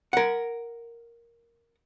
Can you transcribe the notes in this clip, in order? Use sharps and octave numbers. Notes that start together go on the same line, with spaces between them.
A#4 F#5